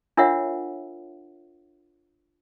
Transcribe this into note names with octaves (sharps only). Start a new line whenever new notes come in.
D4 F4 A#4 C#5 E5 F#5